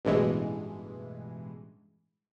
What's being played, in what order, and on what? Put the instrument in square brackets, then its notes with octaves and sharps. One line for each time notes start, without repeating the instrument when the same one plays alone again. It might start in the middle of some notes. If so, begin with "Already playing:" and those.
[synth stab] A1 G2 B2 E3 G#3